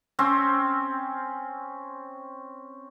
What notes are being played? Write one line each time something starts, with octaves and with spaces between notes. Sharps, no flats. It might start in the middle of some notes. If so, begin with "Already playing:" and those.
C4 C#4